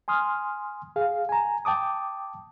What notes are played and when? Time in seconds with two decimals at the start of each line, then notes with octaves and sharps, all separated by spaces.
0.08 G#5 C6 D#6 F6
0.96 G#4 F5
1.29 G#5 A#5
1.65 G5 A5 D6 D#6